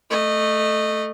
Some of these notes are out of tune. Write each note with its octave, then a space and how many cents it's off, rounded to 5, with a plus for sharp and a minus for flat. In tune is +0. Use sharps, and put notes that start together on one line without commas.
A3 +0 D#5 -20